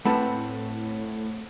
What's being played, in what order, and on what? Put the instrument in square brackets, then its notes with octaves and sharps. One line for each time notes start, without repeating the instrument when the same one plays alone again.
[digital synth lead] A2 [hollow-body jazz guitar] A3 C4 B4 [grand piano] F#5 A5 B5